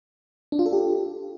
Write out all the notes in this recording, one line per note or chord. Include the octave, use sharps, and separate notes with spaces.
D4
F4
A4
G4